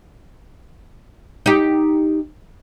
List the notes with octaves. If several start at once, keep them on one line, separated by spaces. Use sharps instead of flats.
D#4 G4